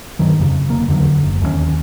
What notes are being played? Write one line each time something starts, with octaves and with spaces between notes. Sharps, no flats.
G2 D#3 F#3
F2 C#3
F1 A#3
E2 D3 E3 F#3
F#1
D#2 A#2 C#4